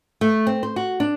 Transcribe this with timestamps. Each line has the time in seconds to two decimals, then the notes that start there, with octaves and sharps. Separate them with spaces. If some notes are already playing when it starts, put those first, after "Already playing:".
0.21 A3
0.47 C4
0.63 C5
0.76 F#4
1.00 D4